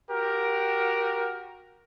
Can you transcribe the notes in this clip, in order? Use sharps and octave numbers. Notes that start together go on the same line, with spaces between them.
F#4 G4 A#4